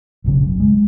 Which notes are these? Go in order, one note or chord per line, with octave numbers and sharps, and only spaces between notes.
F#1 B1 C#3
F#2
G#3